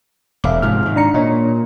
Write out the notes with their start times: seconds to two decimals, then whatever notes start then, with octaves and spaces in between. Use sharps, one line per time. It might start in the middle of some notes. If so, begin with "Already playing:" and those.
0.44 E1 E5 F5 D6
0.62 G#2 C3 F3 F6
0.83 G#2 D#3
0.96 D4 A#5 C#7
1.14 A#2 D4 C#5 D#5